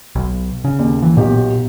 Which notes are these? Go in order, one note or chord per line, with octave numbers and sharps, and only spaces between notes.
B1
C#3
D#2
E3
B1 A#2 G4